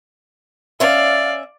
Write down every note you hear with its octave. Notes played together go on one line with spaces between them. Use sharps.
C#4 D5 E5 F5